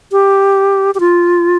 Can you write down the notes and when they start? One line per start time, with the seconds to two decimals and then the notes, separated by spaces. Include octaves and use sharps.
0.12 G4
0.95 G4
1.00 F4